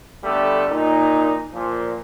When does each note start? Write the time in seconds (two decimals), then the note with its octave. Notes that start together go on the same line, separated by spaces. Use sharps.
0.24 D3 G3 A3 B3 A4
0.70 A#2 D#4
1.54 A#2 F3